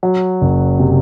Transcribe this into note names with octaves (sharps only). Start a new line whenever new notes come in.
F#3
F#1
C3